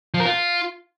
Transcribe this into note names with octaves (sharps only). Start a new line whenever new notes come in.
F3
A#4
F4